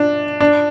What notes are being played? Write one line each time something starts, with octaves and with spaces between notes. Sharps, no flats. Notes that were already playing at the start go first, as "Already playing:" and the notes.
Already playing: D4
D4